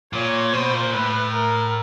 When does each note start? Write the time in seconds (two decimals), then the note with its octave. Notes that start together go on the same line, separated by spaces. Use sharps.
0.13 A#2 C#5
0.53 B2 C5
0.73 A#2
0.93 A2 B4
1.34 A#4